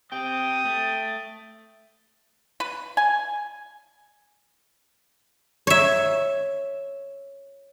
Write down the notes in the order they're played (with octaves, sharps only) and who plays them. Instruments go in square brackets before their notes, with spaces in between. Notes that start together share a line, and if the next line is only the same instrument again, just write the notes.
[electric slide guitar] C4 G4 [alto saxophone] G5 [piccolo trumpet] D#6
[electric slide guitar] A3
[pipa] B4
G#5
[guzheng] C#5 E5